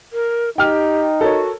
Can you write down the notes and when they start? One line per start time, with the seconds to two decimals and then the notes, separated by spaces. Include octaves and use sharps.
0.13 A#4
0.58 D#4 G4 G5 F6
1.21 F#4 A4 A#4 C#5